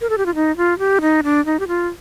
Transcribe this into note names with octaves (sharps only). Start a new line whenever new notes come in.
A#4
A4
G4
F4
D#4
F4
G4
D#4
D4
D#4
G4
F4